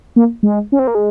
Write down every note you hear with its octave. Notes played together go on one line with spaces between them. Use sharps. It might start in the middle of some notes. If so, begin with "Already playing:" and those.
A#3
G#3
C#4
C4
A#3
G#3